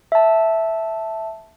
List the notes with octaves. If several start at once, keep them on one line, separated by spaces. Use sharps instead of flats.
E5 A5